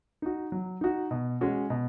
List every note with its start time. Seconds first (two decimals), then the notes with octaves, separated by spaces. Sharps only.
0.22 D#4 F#4
0.52 F#3
0.81 D#4 F#4
1.11 B2
1.41 G#3 C#4 F#4
1.70 B2